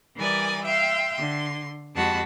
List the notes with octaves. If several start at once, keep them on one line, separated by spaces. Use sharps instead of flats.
E3 G3 A#4 D5 G#5 D#6
E5 F5 G5 C6
D3 C6
F2 G#3 F#4 G4 A5 B5